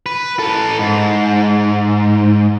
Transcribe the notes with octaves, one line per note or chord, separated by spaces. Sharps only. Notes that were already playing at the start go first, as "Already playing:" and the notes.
B4
A4 B4
G#2